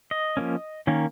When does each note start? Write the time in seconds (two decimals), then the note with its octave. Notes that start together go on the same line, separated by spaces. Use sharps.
0.11 D#5
0.37 F3 A#3 C#4
0.87 D#3 A#3 C#4